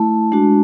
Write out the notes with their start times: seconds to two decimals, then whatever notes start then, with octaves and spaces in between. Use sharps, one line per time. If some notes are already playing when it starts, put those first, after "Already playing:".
Already playing: A3 E4 A5
0.32 G#3 D4 F#4